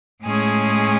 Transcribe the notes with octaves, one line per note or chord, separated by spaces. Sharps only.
A2 G#3 C#4 G#4